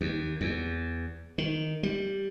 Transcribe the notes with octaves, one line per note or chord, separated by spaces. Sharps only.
D#2
E2
D#3
G3